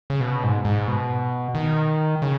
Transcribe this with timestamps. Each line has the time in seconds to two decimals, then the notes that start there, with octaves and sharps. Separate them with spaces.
0.10 C#3
0.21 B2
0.44 G#2
0.65 G#2
0.88 B2
1.55 D#3
2.22 C#3